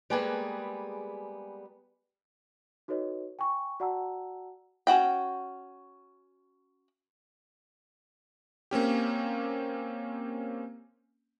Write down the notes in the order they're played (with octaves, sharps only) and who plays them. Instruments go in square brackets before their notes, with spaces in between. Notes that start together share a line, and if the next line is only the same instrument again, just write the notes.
[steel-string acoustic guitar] G3 G#3 A#3 B3 G#4 B4
[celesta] D#4 F#4 A4 B4 C#5 D#5
G5 G#5 C#6
F#4 D5 F#5 A5 A#5 E6
[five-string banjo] C#4 F#4 F#5 G5
[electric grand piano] A#3 C4 C#4 G4